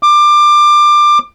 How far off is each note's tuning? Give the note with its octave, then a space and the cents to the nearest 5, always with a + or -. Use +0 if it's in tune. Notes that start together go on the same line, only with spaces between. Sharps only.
D6 +20